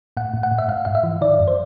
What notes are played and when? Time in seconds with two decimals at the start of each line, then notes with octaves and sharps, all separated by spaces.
0.17 A2 F#5
0.34 A2
0.43 F#5
0.51 A2
0.58 E5
0.68 G#2 F5
0.85 G#2 F5
0.95 E5
1.04 E3
1.21 D#3 D5
1.40 F#2
1.48 C5